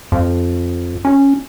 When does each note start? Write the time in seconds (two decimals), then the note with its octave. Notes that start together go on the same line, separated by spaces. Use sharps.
0.12 F2
1.05 C#4